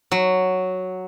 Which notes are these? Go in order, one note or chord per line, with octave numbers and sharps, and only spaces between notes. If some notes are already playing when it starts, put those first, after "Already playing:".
F#3